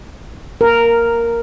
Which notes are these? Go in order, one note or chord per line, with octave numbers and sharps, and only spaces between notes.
A#4